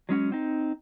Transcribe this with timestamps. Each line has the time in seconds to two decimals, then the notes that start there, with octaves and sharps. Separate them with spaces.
0.09 F#3 G#3 C#4 F#4
0.32 C4 D#4